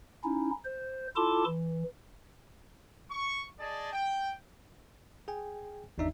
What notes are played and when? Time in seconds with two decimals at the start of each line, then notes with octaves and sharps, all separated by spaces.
0.24 C#4 D#4 E4
0.65 C5
1.16 E4 F4 A4 A5 C6 D6
1.46 E3
3.10 C#6
3.59 G#4 D5 D#5 A5
3.92 G5
5.28 G#4 G5 G#5
5.98 G#1 E2 D4 D#4 D5 E5